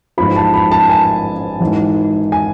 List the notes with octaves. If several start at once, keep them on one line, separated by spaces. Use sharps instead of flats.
A1 G#2 F3 B5
A5
B5
A5
G#5
G#1 G#2 E3
G#5